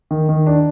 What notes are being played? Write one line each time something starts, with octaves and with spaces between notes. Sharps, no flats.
D#3
D#3
D4